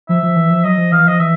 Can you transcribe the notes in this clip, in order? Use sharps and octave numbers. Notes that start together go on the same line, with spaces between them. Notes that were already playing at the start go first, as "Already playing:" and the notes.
F3 E5
F3
E3
F3
F#3 D#5
F3
E3 F5
F3 D#5
E3 E5